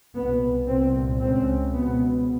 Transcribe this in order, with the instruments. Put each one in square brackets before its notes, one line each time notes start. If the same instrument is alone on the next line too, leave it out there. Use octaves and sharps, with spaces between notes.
[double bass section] C2 B2 B3
C2 A#2 C4
C#2 C#3 C4
C#2 B2 B3